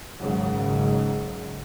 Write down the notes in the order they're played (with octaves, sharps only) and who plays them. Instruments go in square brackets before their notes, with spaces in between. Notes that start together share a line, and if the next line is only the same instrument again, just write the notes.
[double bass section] G#1 G#2 C#3 F#3